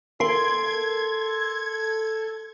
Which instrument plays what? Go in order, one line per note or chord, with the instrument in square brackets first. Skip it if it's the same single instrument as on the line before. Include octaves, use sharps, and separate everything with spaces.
[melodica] A4 [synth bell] A#4 C7 [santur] C6 [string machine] G#6